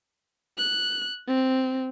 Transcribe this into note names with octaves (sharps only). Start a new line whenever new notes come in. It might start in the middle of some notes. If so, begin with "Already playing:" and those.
F#6
C4